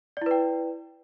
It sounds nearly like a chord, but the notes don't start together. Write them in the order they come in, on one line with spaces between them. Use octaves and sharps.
D5 E4 B4 G5